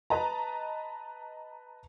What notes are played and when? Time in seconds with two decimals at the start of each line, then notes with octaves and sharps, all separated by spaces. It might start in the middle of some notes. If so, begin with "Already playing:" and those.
0.10 B4 D#5 A5 A#5